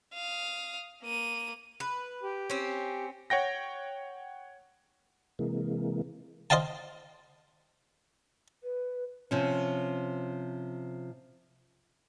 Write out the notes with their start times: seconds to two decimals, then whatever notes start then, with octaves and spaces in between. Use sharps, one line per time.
0.14 F5 D#6
1.03 A#3 D#7
1.80 B4
2.23 G4
2.50 C4 C#4
3.30 C#5 F#5 G5 A#6
5.39 C3 E3 G#3 A#3
6.50 C5 D#5 F5 G5 A5
8.63 B4
9.31 C3 F3 C#4